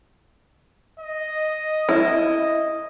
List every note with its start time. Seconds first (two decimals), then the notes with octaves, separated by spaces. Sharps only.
0.99 D#5
1.89 E4